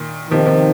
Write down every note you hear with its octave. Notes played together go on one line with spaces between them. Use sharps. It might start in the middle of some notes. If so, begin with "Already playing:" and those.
Already playing: A#2 D#3
C3 D#3 F3 C4 D#4
C3 F3